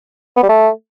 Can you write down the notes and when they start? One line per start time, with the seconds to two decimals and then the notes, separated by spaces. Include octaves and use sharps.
0.37 B3
0.43 G3
0.49 A3